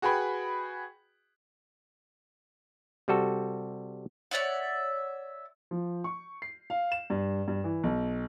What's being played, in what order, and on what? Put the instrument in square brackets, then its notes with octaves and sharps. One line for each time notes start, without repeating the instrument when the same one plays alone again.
[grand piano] F#4 G#4 B4 G5 B5
[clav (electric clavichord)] C3 G3 F#4 A4
[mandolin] C#5 D5 E5 F#5
[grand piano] F3
C#6
C7
F5
E7
G2
G2
E3
B1